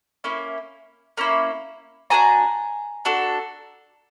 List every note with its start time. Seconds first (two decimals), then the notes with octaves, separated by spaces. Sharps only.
0.24 A#3 C#4 E4
1.17 A#3 C#4 E4
2.10 D4 F#4 A4 G#5 A#5
3.05 D4 F#4 A4